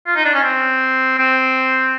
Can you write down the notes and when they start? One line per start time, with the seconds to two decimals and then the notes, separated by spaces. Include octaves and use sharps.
0.07 F4
0.16 D#4
0.25 D4
0.34 C#4
0.44 C4
1.18 C4